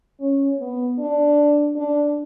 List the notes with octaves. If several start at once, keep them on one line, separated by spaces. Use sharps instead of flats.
C#4
B3
D4
D4